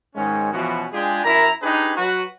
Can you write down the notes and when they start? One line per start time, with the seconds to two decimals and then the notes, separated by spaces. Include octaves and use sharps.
0.15 G#2 D#3 G#3 C#4
0.52 B2 E3 F3 B3 C#4 F#4
0.92 G#3 D4 F4 G4 G#4
1.24 F#2 E4 A#4 A#5
1.62 D4 D#4 G4 G#4 B4
1.96 F#3 F#4 B4